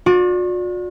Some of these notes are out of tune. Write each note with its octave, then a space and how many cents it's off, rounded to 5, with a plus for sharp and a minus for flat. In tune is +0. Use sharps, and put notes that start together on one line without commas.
F#4 -45 D5 +0